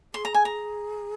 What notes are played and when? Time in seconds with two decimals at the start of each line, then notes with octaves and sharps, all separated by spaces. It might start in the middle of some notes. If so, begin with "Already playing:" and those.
0.14 G#4 C6
0.25 A#5
0.34 G#5
0.45 A#5